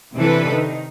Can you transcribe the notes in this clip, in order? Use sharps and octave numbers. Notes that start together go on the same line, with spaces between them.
C3 E3 D4 E4 A4 B4
D#3 D#4